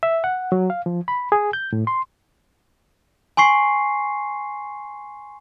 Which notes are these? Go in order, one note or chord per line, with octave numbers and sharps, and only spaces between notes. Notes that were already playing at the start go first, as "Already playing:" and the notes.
E5
F#5
F#3
F5
F3
B5
G#4
G6
A2
C6
G#5 C6 C#6 C7